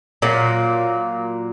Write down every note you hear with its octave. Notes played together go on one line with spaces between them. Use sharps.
A#2 F#3 A#3